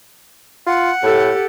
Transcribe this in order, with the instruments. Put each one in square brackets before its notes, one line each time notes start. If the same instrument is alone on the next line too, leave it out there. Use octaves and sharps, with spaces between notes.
[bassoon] F4 [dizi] F#5
[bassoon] A2 [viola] G4 A4